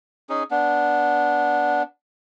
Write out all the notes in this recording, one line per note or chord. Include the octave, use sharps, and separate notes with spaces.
C#4 D#4 G#4
B3 D4